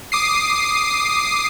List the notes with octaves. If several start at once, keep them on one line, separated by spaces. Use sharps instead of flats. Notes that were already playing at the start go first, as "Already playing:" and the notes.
D6 D#6 C7